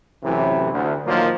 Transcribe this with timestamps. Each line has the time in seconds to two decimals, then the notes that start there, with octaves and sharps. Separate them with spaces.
0.24 F#2 A2 C3 E3
0.73 D2
1.06 A#2 D#3 F3 F#3 A#3 F4